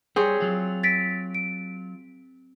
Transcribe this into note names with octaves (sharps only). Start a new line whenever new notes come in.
G3 C4 G#4 C#5
F#3 F4
A6 B6 D7
D7